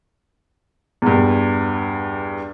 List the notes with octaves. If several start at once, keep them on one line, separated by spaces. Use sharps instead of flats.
E2 G2